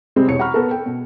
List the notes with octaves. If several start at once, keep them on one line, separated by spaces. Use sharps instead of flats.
C3 G3 G#3 C4
E2 B2 C#5 C#7
F#5 A#5 B5 C#6 F6
B3 A4 A#4
G5
B2